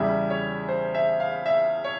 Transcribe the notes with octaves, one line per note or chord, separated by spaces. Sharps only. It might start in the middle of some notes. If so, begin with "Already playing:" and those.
Already playing: E2 C#3 G3 E5
C#5
C5
E5
F5
E5
C#5